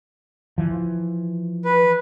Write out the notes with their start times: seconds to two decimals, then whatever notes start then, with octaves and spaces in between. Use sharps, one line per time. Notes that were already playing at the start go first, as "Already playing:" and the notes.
0.58 E3 F3
1.65 B4